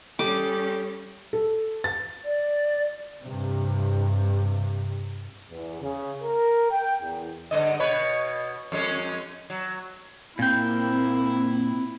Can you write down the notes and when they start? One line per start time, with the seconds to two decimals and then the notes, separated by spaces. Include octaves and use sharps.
0.19 G3 C#4 G4 A4 D6
1.33 A4
1.84 A6
2.25 D5
3.23 G2 C3
5.50 E2
5.81 C#3
6.23 A#4
6.70 G5
7.01 E2
7.51 G2 D3 D#5
7.80 B2 B4 C#5
8.72 F2 G#3 C#4
9.50 F#3
10.39 A#2 A#3 C4 E4 G5